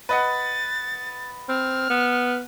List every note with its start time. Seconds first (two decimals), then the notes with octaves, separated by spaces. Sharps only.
0.09 B4 D#5 F#5 A6
1.49 C4 F6
1.90 B3